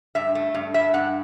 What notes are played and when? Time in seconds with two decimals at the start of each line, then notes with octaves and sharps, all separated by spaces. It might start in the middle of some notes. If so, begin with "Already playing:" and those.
0.15 G2 E5
0.35 A3
0.54 G2
0.74 G2 E5
0.94 G2 F#5